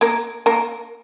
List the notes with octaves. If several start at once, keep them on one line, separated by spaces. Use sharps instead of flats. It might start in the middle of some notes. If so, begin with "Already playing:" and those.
A#3 A#4
A#3 A#4